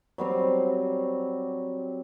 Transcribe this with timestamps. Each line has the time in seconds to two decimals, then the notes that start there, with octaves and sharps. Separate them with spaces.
0.18 F#3 G3 C4